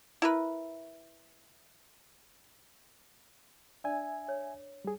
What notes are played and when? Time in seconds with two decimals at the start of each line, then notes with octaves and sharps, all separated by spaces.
0.22 E4 A#4 B4
3.84 D4 D5 E5 G#5
4.28 C#5
4.85 G3 G#4